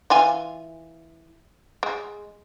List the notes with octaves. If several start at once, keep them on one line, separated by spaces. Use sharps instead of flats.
E3 F4 G#5
G#3